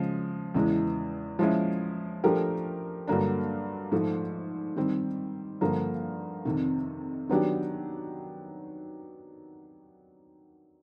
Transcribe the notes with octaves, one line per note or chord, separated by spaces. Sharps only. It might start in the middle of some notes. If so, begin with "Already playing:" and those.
Already playing: C#3 F3 G#3
E2 C#3 E3 G#3
F3 G#3 C#4 E4
F3 A3 D4 G4 A#4
G2 D3 F#3 A#3 D4
G#2 F3 A3
D#3 G3 C4
G2 D3 F3 A#3
F2 C3 D#3
D#3 F#3 B3 D4 G4